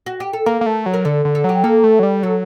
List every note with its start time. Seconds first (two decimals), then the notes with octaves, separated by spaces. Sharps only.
0.06 F#4
0.20 G4
0.33 A4
0.46 A#3 A#4
0.61 A#3
0.66 A3
0.86 F#3
0.94 A#4
1.05 D3 A4
1.25 D3
1.35 A4
1.44 F#3 G4
1.64 A#3 A4
1.84 A3
1.99 F#3
2.03 G3
2.23 F#3 A4